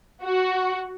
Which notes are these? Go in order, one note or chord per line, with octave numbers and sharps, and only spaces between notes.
F#4